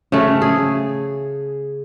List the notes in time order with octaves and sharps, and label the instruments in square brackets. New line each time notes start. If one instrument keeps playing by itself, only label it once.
[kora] C#3 A3
G#4